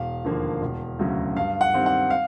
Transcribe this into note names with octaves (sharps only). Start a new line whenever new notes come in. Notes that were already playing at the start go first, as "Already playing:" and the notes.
Already playing: E1 F5
D#2 D3 F3 A#3
E1
D2 C#3 F#3
G2 F5
F#5
D#3 G3 C4
F#5
F5